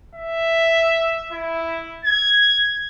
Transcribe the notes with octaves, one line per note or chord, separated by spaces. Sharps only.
E5
E4
G#6